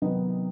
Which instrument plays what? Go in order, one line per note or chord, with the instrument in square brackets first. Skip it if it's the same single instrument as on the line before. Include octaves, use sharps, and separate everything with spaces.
[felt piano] C3 D#3 F#3 B3 D#4